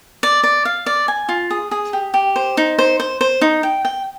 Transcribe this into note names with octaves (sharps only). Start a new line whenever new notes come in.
D5
D5
F5
D5
G#5
F4
G#4
G#4
G4
G4
C5
D#4
C5
C5
C5
D#4
G5
G5